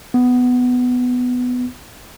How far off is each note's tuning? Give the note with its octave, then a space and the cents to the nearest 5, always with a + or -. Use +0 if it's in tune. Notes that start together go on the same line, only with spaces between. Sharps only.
B3 +10